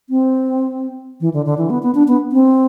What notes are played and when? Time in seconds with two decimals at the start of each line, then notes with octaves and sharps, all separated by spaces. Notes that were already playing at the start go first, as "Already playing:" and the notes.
0.10 C4
1.21 E3
1.34 D3
1.46 D3
1.58 E3
1.70 B3
1.83 B3
1.95 D4
2.08 B3
2.32 C4